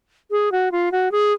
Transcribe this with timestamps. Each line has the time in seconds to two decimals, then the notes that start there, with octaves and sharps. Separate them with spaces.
0.31 G#4
0.52 F#4
0.72 F4
0.92 F#4
1.12 G#4